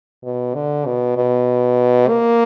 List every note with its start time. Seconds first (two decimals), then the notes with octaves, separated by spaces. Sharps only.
0.24 B2
0.54 D3
0.86 B2
1.17 B2
2.08 A#3